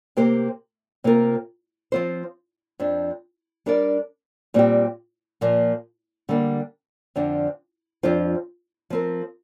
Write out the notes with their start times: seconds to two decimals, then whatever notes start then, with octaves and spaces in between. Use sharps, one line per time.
0.17 C3 A#3 G4 C5
1.04 C3 A#3 F4 A#4
1.92 F3 C4 F4 C5
2.80 F2 F3 D4
3.66 G3 D4 A#4 D5
4.54 A#2 G3 C4 G4
5.41 A#2 F3 A#3
6.29 D3 G3 A#3 D4
7.16 F2 D3 F3 D4
8.03 F2 F3 D4 F4 C5
8.90 F3 C4 A#4